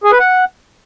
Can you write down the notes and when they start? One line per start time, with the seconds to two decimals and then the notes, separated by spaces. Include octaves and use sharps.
0.04 G#4
0.11 B4
0.19 F#5